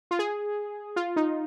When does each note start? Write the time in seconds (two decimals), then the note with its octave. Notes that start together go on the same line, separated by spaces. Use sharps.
0.11 F4
0.19 G#4
0.96 F4
1.16 D#4